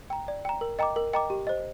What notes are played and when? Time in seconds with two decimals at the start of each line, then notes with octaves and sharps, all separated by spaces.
0.10 G5 A#5
0.28 D5
0.45 G5 A#5
0.61 A#4
0.79 D#5 G5 A#5 D6
0.96 A#4
1.13 D#5 G5 A#5 D6
1.30 G4
1.47 C5 D#5